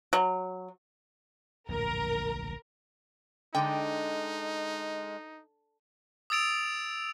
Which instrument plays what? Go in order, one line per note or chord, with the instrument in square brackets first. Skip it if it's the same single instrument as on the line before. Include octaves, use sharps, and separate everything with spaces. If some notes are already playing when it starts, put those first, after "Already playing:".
[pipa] F#3
[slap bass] D1 A#1 F2 [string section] A#4
[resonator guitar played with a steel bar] D3 [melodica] G#3 [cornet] D#4 [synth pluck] G5
[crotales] D#6 E6 A6 D7 F7